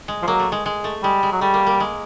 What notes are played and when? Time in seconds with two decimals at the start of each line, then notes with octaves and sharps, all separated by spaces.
0.08 G#3
0.23 F3
0.27 F#3 A#3
0.39 A3
0.52 G#3
0.66 G#3
0.84 A3
1.03 G3 G#3
1.23 G#3
1.32 F#3
1.41 G3 A3
1.54 A#3
1.67 A#3
1.80 G#3